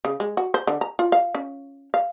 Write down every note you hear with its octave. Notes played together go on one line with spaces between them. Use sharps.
C#3
G#3
F#4
C5
D3
A#5
F4
F5
C#4
F5